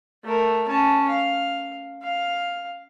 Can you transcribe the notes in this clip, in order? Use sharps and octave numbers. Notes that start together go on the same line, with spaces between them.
A3 A#4
C#4 A5
F5
F5